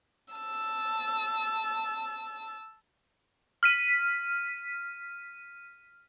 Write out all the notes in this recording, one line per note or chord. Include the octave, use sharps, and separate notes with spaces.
A5 E6
F6 B6 D#7